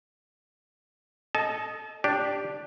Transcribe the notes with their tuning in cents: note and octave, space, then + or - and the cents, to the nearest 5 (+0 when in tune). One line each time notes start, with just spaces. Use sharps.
A4 +0 D#5 +0 A5 -40
D4 +0 G4 +0 D5 +0